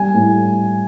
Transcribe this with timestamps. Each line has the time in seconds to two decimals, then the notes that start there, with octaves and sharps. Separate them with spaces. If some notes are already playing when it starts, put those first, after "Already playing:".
Already playing: G3 G#5
0.14 A2